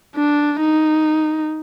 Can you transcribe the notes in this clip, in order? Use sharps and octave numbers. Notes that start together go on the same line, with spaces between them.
D4
D#4